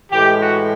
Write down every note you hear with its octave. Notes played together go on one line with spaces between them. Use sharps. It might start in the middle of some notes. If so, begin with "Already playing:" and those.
A2 E3 G#3 G4
F#4